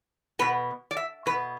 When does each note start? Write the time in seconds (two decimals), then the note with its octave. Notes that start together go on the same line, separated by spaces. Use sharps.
0.39 B2 B3 B4
0.91 D5
0.97 E5
1.26 B2 B4
1.30 B3